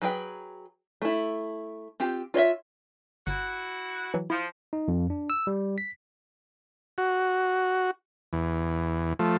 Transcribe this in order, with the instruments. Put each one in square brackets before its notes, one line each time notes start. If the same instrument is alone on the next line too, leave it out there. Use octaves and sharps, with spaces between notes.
[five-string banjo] F#3 G#4 B4 G5
A3 E4
C4 F4 G4
F4 C#5 D#5 E5
[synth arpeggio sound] G1 [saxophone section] E4 F#4
[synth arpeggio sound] E3 F#3
[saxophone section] F3 [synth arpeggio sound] E4
[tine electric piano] D#4
F2
D4
E6
G3
B6
[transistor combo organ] F#4
E2
F3 A3